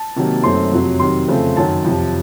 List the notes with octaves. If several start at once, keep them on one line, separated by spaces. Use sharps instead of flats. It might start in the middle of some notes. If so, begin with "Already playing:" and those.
Already playing: A5
C3 D#3 F#3 A#3
F#2 D#3 A3 C4 C6
F2 C3 F#3
C3 D#3 F#3 C6
F2 C#3 A3 C4
F#2 D#3 F#3 A5
F2 C3 F3